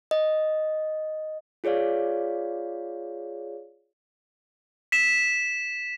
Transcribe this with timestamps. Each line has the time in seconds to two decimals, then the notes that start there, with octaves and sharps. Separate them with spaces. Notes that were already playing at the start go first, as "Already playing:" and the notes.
0.11 D#5
1.64 F4 G#4 C#5 D5 F5
4.92 B6 E7